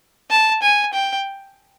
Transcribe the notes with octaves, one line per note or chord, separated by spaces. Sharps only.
A5
G#5
G5